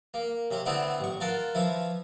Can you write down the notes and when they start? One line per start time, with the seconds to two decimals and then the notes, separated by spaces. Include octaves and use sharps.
0.14 A#3
0.51 C3 C#4
0.66 D3 A3 B3 C4 E4
1.00 A1 C#6
1.20 F4 A4 A#4 F#5
1.55 E3 F3 E4